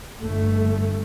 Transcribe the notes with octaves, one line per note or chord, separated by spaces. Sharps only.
G1 A3